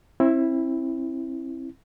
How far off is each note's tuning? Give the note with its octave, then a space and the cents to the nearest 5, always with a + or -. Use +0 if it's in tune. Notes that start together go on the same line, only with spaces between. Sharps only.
C4 +35 E4 +0